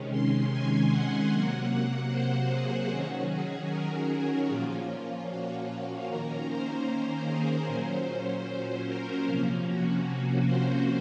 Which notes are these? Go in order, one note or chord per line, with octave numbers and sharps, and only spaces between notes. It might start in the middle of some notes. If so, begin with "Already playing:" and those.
Already playing: C3 D#3 G#3 C#4
C6
G#5
F#5
C3 F#3 A#3
C5
G#4
D#3 F#3 C#4 F#4
G#4
A#4
F#4
A#2 F3 A#3 C#4 F4
F4
F#4
D#3 A#3 C#4 A#4
C5
A#4
G#4
A#2 F#3 C#4 C5
A#4
C3 F3 A#3 C#4
F#4
C5